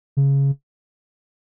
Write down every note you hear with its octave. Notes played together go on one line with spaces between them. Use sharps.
C#3